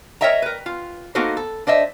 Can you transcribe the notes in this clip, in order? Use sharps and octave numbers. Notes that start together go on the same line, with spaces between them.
A#4 C#5 D#5 E5 G5 A#5
A#4 B4
F4
A#3 B3 D#4 F#4 A4 C5
A4
D4 C5 D#5 E5